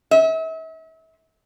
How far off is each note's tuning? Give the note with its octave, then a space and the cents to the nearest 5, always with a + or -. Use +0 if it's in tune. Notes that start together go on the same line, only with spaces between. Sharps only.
E5 -40